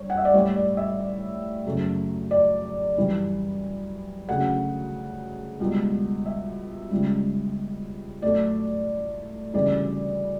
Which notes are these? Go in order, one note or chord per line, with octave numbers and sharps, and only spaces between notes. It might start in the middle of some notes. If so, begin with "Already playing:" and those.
Already playing: G2 C#5
F#5
E5
D5
A2 G3 C#5
D5
E5
D5
F#2 C#3 F#3 A3
D5
F#2 E3 G3
D2 C#3 F#3 A3 F#5
C#2 B2 G3
E5
C#2 C#3 G3
A2 F#3 A3 D5
D2 C#3 E3 G3 D5